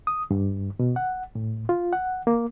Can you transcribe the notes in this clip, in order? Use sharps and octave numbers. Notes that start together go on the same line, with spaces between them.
D#6
G2
B2
F#5
A2
F4
F#5
A#3